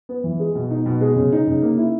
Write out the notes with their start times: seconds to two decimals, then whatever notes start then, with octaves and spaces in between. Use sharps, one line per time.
0.09 B3
0.24 E3
0.40 G#3
0.55 B2
0.71 D#4
0.86 B2
1.01 G#3
1.16 C#3
1.32 D#4
1.48 C#3
1.62 A#3
1.78 E4